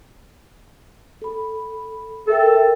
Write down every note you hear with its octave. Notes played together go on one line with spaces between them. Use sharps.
A4 B5
A4 A#4 E5 G5